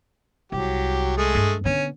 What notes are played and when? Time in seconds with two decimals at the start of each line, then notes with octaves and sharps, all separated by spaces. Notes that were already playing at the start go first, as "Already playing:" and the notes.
0.52 C2 F#3 G4
1.17 G#3 A3 G#4
1.35 G2
1.65 D3 B3 C#4